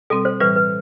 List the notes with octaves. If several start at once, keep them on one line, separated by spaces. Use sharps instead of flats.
B2 G3 C4 A4
C5
A2 E3 G3 B4
B4